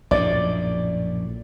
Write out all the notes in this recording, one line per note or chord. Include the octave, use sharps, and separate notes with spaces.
A#1 F#2 A2 D5